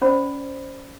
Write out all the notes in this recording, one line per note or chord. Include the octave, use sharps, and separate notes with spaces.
C#4 C5 D5 B5